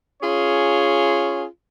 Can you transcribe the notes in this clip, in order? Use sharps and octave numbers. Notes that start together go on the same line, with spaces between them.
C#4 F4 G#4 C#5